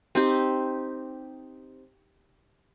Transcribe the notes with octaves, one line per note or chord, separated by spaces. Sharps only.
C4 D#4 G4